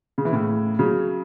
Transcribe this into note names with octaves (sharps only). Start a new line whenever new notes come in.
C#3
E3
A2 C#3
C#3 F#3